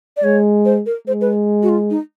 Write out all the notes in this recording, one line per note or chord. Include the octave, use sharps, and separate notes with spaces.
D5
G#3 C#5
C5
A#4
G#3 C5
B4
F#4
F4
D#4